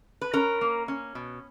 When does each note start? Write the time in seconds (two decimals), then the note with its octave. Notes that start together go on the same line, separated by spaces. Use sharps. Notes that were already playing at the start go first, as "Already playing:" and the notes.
0.21 B4
0.34 C#4 A#4
0.61 A#3
0.88 C#4
1.15 B2